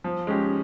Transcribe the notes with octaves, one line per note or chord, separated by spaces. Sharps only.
F3
G#3 C#4 G4